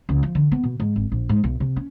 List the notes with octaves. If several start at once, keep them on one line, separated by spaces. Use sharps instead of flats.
C#2
F3
D3
B3
B2
G#2
G#1
A#1
G#2
B1
C3
C#4